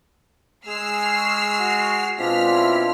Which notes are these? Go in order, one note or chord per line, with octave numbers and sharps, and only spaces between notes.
G#3 G#4 E6 F6 C7
C#6
F#4
B2 G#3 C4 D4 F4 F6 B6
E4